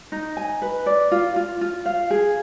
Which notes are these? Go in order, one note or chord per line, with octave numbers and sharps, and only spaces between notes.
D#4
G#5
B4
D5
F4
F4
F4
F5
G#4